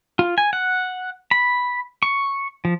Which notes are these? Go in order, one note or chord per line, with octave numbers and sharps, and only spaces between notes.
F4
G#5
F#5
B5
C#6
F3